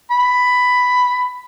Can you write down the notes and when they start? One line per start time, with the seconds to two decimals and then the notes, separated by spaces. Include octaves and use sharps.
0.11 B5